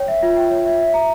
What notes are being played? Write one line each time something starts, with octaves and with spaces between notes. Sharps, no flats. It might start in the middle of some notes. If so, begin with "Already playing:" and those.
Already playing: C#5 G5
E5
F4
G5
C#5
E5
E5
A#5